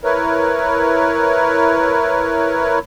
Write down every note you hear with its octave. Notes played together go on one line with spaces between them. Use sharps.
E4 A#4 B4 C#5